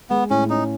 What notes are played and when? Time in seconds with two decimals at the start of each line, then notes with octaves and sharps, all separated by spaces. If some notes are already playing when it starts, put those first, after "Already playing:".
0.10 G#3 B3
0.30 A2 C#4
0.50 C#4 D#4